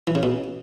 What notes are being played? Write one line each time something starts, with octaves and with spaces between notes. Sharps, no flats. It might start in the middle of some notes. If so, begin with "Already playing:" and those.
E3
C#3
B2